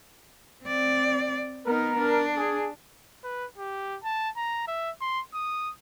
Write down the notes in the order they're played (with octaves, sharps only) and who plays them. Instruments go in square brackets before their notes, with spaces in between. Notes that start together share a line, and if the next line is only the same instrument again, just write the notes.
[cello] C4 D5
[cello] B3 D#4 [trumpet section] A#4
[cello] D4
[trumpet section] G#4
[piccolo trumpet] B4
G4
A5
A#5
E5
C6
D#6